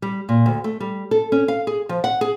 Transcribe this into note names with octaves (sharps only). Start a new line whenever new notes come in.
G3
A#2
D2
A3
G3
A4
C#4
F5
G#4
F3
F#5
G#4